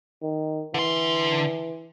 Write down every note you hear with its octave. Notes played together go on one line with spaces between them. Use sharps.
D#3
D3 E3 C6